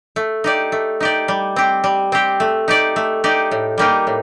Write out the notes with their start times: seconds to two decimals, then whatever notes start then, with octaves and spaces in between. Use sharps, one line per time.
0.16 A3
0.44 D#4 G4 D5
0.72 A3
1.00 D#4 G4 D5
1.28 G3
1.56 C4 G4
1.84 G3
2.12 C4 G4
2.40 A3
2.68 D#4 G4 D5
2.96 A3
3.24 D#4 G4 D5
3.51 A2
3.78 G3 A#3 D#4 G4
4.07 A2